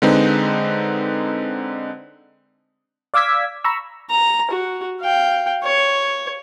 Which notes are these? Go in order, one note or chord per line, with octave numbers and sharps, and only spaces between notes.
D3 G#3 C4 D#4 B4
D5 F5 D6 E6 G#6 B6
A#5 B5 C#6 E6
A#5
F#4
F5 G5
C#5